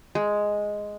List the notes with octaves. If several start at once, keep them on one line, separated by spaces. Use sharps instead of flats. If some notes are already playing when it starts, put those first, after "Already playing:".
G#3